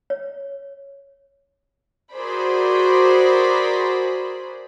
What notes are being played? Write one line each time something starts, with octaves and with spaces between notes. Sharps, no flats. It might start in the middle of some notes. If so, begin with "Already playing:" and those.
C#5
F#4 G#4 A#4 C5 D5 B5